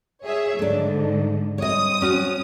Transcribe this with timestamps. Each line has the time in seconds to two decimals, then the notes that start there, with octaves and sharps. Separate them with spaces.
0.24 G#4 C#5 E5
0.59 G#2 D3 A3 D4
1.58 G2 C4 C#5 D#5 D#6
2.02 C#4 F#4